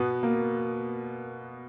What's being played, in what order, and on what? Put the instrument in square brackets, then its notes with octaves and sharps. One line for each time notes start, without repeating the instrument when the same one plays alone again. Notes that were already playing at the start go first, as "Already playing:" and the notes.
Already playing: [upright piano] B2 B3
A#3